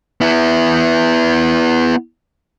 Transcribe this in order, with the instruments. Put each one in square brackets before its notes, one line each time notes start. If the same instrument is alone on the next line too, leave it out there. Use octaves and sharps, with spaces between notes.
[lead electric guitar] B3 E4